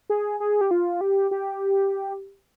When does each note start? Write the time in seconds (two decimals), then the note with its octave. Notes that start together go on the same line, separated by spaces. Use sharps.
0.10 G#4
0.40 G#4
0.61 G4
0.71 F4
1.01 G4
1.31 G4